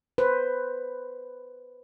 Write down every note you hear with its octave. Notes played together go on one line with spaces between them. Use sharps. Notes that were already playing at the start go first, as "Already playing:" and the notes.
B4 C5